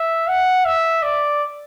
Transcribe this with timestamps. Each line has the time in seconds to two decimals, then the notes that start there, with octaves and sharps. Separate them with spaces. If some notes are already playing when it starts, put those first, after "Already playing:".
Already playing: E5
0.28 F#5
0.65 E5
1.03 D5